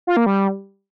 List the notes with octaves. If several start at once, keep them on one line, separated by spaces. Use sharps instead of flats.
F4
A#3
G3